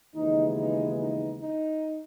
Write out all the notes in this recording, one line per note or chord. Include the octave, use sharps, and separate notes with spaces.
D#2 C#3 E3 G#3 B3 D#4
D#4
D#4
D#4